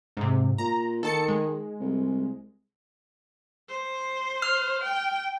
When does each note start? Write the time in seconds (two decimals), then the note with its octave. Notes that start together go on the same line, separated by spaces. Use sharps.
0.17 G#2 C3
0.58 A#2 A#5
1.03 D#3 A4 A5 C#7
1.28 G#3
1.80 C2
3.69 C5
4.42 F6
4.83 G5